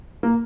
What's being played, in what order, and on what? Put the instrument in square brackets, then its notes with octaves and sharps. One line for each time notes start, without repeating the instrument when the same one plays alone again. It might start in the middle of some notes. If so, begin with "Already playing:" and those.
[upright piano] A#3